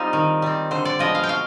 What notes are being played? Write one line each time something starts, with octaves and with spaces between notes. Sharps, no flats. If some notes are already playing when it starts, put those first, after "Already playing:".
Already playing: G3 C4 D#4 F4
D#3
G3 C4
D3 C5
D5
F3 G#3 B3 D#5
F5
G5
B2 F5